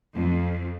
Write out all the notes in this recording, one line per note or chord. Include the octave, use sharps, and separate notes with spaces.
F2